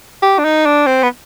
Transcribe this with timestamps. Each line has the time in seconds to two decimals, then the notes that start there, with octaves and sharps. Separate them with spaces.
0.22 G4
0.39 D4
0.44 D#4
0.66 D4
0.87 C4
1.03 B3